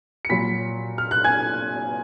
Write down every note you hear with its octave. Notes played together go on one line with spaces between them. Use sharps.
C#7
A#2 F#3 B5 B6
F6
F#6
G#5 G#6